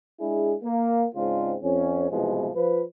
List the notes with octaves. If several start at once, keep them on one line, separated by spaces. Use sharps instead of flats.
G#3 D4 E4 G#4
A#3
G#2 C#3 G#3 C4 D4 F4
F2 C#4
C2 G#2 B2 E3 F3 G#3
F3 B4